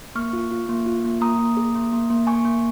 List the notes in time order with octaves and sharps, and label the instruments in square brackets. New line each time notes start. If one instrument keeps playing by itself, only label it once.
[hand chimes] A#3 C#6 F6
F4
F4
A#3
F4
A#3
A#3 A#5 D#6
A#3
G#4
A#3
A#3
A#3
A#3 G#5 C#6
A#3